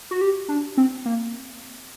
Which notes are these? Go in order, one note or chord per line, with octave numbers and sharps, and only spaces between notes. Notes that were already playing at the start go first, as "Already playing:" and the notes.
F#4
G4
D4
C4
A#3